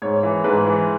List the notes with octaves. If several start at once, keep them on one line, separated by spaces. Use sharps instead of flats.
G#2 C#5
E3
G#2 B4
E3